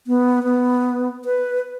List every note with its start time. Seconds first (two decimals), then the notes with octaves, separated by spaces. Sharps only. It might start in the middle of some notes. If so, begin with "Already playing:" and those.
0.07 B3
0.43 B3
1.25 B4